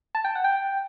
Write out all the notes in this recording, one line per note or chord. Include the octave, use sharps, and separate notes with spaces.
A5
G5
F#5
G5